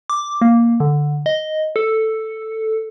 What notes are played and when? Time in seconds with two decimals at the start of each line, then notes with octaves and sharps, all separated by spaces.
0.10 D6
0.42 A#3
0.80 D3
1.26 D#5
1.76 A4